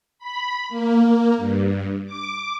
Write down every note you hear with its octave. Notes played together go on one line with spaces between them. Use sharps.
B5
A#3
G2
D6